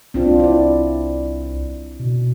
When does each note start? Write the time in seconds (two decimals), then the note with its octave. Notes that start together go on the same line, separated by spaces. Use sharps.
0.14 C2 C4 D4 F4
0.40 E4 D5
1.99 B2